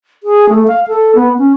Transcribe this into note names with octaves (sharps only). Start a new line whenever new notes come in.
G#4
A3
F5
A4
B3
C#4